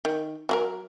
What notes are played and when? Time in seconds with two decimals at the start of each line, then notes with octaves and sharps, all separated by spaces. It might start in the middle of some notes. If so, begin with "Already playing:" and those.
0.05 D#3
0.49 F#3 F#4 A#4